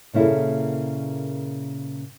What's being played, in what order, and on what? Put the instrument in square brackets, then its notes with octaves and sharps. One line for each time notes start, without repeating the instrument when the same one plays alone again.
[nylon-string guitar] A#2 C#3 A#3 E4 G#4 A4